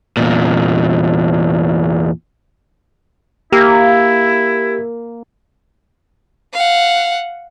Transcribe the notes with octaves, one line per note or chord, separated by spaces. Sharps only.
E2 A#2
A#3 E4 G4 E6
F5 F#5